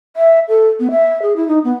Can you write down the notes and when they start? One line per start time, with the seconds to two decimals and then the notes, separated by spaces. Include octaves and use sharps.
0.16 E5
0.48 A4
0.80 B3
0.91 E5
1.22 G#4
1.36 E4
1.48 D#4
1.64 B3